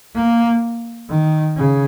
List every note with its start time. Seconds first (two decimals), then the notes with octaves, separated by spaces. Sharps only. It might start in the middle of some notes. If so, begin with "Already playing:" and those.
0.15 A#3
1.10 D#3
1.57 C#3